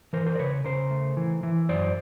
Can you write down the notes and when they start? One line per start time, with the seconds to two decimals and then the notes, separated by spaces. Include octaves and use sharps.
0.13 E3 A#4 C5
0.26 A#4 C5
0.35 D5
0.39 C#3 B4 C#5
0.65 C#3 A#4 C5
0.91 A3
1.17 E3
1.43 E3
1.69 F#2 C5 D5